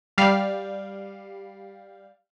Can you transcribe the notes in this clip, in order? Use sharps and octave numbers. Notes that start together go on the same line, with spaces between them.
G3 F5